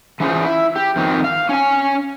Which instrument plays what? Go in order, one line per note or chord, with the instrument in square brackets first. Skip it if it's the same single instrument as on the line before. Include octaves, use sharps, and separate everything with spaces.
[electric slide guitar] E3 C#4 F4 G#4 C5
E4
G4
F2 D#3 C4
F5
C#4 G#5